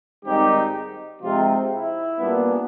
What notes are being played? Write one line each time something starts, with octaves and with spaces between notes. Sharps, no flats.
G#2 D#3 G3 C4 D#4 G4
C3 F3 G#3 C4 D#4 F4
E4
A#2 G3 B3 D4